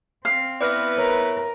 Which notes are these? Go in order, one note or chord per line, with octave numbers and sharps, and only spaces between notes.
C4 F5
B3 E4 B4 D5 F6 A#6
A#4 C#5